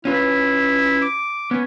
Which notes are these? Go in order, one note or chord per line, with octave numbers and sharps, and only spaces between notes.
C#4 E4 F4 B4
D6
B3 C#4